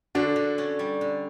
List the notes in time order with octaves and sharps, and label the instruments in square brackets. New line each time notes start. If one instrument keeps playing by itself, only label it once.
[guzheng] D3 [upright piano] D4 F#4
[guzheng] D3
C#4
G3
D3